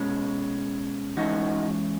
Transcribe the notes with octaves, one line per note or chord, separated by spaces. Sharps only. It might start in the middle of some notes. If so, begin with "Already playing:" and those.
Already playing: B2 G#3 C#4
E3 G#3 C#4 D#4 F#4